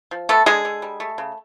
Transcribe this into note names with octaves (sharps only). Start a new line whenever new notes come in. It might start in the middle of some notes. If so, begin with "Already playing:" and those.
F3
A3 B3 A4
D3 G#3 G#4
D3
G3
A3
C#3